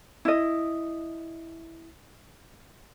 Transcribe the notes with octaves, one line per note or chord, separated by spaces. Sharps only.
E4 D#5